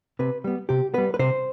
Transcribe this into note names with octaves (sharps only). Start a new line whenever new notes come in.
C3 B4
G3 B3
C3 G4
G3 B3 B4
B4
C3 C5